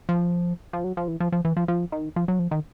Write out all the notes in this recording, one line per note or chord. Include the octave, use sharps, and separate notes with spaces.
F3
F3
F#3
F3
E3
F3
F3
E3
F3
F3
D#3
F3
F#3
F3
D#3